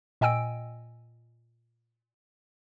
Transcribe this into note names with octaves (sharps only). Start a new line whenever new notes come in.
A#2 D#5 G5 G#5 E6 D7